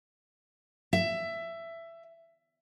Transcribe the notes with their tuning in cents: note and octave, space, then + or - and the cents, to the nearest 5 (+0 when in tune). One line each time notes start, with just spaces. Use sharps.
E5 +15